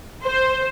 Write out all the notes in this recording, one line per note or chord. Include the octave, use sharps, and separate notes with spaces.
C5